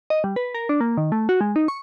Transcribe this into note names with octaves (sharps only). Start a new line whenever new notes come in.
D#5
G3
B4
A#4
D4
A#3
D#3
A3
F#4
G#3
D#4
C#6